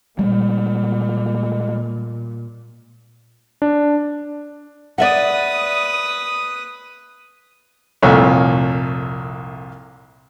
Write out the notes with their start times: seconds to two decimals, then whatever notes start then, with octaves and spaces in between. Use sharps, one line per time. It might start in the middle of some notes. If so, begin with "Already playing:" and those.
0.19 A#2 G3 G#3
3.62 D4
4.98 B4 D5 E5 F#5 D#6
8.02 C2 F2 A#2 A3 C#5